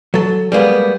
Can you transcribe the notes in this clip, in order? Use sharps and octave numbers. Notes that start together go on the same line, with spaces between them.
F#3 A4
G3 G#3 A#3 B3